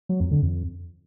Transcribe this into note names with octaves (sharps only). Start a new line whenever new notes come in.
F#3
F2
D3
F2